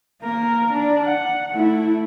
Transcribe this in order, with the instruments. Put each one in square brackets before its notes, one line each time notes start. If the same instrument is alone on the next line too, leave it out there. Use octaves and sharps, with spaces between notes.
[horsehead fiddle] A#3 A#4
D4
F#5
A3 E4